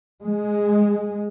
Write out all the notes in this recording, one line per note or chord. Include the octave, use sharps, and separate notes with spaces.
G#3